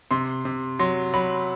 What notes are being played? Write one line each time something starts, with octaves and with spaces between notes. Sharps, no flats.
C3 C6
C3
F#3 C6
F#3 B5